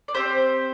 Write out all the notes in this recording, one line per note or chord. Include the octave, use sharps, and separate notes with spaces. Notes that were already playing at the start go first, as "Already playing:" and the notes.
D5
C4 G4 C5